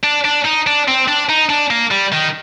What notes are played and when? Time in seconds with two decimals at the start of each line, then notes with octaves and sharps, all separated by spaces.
0.04 D4
0.25 D4
0.45 D#4
0.67 D4
0.88 C4
1.08 D4
1.29 D#4
1.50 D4
1.71 A#3
1.91 G3
2.12 D#3